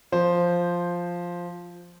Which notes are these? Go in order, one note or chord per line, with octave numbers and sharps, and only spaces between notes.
F3 C5